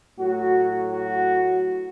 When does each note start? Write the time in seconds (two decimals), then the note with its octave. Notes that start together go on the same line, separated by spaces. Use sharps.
0.17 A2 F#3 F#4
0.91 F#4